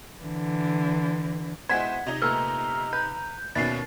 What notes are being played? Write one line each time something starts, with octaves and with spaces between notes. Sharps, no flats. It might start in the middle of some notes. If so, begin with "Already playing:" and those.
D3 E3
B2 G#3 E4 C5 F#5 G#5 G#6 B6
C3 D#4 D#5 A#5
A#2 A3 B3 A#5 E6 F6
B4 G6
D#2 B2 C#4 B4 D5 E5 A6 C7